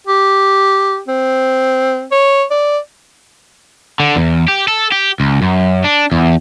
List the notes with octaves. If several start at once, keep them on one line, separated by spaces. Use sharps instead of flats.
G4
C4
C#5
D5
D3
E2
G4
A4
G4
C#2
F#2
D4
E2